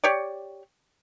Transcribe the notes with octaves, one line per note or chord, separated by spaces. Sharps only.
G4 C#5 D5